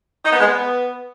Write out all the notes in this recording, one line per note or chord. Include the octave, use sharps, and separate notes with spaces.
D#4
B3
G#3
B3